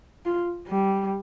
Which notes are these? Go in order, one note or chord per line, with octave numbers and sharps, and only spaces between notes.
F4
G3